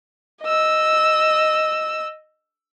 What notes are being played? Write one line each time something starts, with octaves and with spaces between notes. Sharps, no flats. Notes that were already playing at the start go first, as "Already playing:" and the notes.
D#5 E6